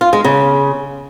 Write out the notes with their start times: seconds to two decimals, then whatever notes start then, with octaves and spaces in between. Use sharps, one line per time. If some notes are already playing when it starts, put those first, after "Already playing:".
0.01 F4
0.13 G#3
0.24 C#3